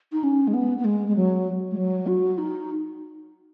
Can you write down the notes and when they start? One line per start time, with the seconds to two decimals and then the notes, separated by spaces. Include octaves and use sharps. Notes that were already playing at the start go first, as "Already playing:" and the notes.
0.12 D#4
0.23 C#4
0.47 G#3
0.54 B3
0.79 B3
0.85 G#3
1.08 G#3
1.16 F#3
1.71 G#3
1.77 F#3
2.07 F#4
2.38 D#4